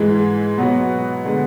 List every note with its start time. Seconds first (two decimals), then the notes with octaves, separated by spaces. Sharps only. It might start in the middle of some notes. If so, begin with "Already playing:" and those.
Already playing: G#2 E3 G#3
0.58 B2 F#3 B3 F#4
1.25 D3 G#3 B3